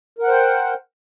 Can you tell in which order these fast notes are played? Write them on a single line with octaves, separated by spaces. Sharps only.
A#4 F#5 C5 G5